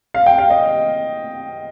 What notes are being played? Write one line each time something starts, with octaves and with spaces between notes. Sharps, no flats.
F5
G5
F5
D#5